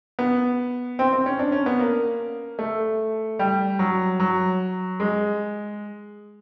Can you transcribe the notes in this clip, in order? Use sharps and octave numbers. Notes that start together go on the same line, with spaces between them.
B3
C4
C4
C#4
D4
C#4
B3
A#3
A3
G3
F#3
F#3
G#3